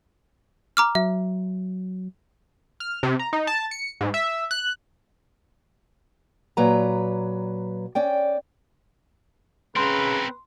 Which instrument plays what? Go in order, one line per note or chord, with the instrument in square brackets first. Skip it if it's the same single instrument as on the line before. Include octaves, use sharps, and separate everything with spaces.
[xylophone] A#5 D6 F6
[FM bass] F#3 [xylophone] E5
[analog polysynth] F6
C3
A#5
D#4
A5
C#7
G#2
E5
F#6
[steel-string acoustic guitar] A#2 F#3 B4 A#5
C#4 D5 G5
[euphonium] C#3 [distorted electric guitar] C4 A#4 [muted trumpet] B4 [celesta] C6